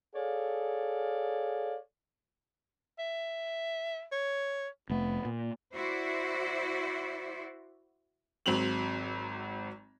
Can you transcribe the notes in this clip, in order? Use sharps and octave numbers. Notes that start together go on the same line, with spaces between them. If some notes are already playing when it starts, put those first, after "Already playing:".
G#4 A4 C#5 D5 F5
E5
C#5
F1 A3 B3
A#2
E4 F#4 C5 D5
G#1 F#3 C4 F7 F#7